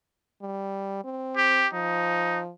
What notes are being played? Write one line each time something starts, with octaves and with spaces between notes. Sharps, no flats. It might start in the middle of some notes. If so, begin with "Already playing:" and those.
G3
C4
G4
F3 D#4